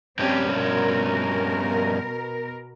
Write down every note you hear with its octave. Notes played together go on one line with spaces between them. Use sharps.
G2 C4 C#4 G4
B2 A#4